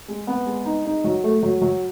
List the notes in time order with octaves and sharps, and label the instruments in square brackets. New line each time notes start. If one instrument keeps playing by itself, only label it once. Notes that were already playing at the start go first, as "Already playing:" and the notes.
[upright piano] G#3
B3
G#3
D#4
D#4
F#3
A3
F#3
F#3